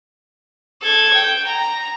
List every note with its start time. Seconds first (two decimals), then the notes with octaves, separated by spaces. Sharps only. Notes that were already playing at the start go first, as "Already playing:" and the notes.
0.82 A4 G#6
1.14 G5
1.48 A#5